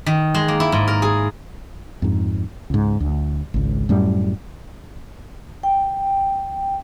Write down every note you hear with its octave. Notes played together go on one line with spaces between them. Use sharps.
D#3
G#3
A#3
E4
G#2
A#4
G#4
F2 G#2
C#2 G#2
D2
G#1 C#2
F#2 A2 G3
G5